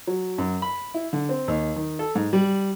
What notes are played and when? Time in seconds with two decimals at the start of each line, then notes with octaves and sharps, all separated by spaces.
0.07 F#3
0.38 F#2
0.62 B5
0.94 E4
1.13 D3
1.29 C4
1.48 D#2
1.76 D#3
1.99 A4
2.15 G#2
2.33 G3